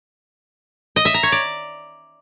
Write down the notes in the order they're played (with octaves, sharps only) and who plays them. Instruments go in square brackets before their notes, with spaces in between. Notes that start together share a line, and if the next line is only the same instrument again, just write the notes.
[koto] D#5
E5
A#5
C#5
D5